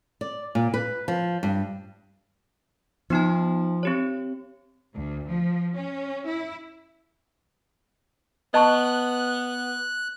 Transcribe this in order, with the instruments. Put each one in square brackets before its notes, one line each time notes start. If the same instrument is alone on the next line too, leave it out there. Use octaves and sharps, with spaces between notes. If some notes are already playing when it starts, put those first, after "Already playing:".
[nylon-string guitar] D5
A#2
B4
F3
G2
[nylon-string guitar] F3 [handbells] B3 D#4 A5
[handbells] C4 G4 C#5
[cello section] D2
F3
C#4
E4
[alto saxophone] B3 [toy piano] D#5 A5 C#6 [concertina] F#6